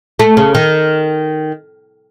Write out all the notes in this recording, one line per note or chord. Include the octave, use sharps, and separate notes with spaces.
A3
C#3
D#3